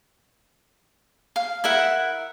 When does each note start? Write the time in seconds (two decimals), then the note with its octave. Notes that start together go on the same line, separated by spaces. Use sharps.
1.36 F5
1.64 E4 A#4 E5 F#5